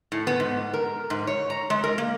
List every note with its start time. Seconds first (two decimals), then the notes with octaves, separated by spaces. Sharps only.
0.12 A2
0.27 B3
0.40 G#2
0.74 A#4
1.10 G#2
1.27 C#5
1.50 A#5
1.70 G#3
1.84 A#4
1.98 A#3